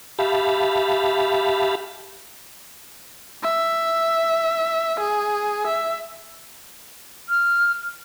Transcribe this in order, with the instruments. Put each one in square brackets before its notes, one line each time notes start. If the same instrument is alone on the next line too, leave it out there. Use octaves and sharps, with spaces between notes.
[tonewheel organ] G4 E5 F5 A5 B5
[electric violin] E5
G#4
E5
[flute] F6